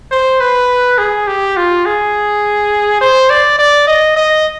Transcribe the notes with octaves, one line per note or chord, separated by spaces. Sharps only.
C5
B4
G#4
G4
F4
G#4
C5
D5
D5
D#5
D#5